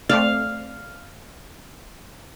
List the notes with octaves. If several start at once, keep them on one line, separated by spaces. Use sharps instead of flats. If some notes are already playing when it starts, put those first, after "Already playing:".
A3 C4 D5 F5